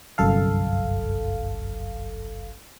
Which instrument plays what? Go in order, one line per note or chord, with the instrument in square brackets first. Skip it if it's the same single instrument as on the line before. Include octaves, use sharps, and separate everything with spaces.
[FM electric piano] G1 C2 F#2 A4 F5